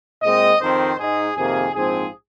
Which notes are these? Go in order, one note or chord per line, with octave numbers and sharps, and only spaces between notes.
A#2 G#3 C4 D#5
F2 D#3 C4 C5
G#2 G#3 D#4 G#4
F2 C3 D#3 A#3 G#4
A#1 G#2 F3 C4 G#4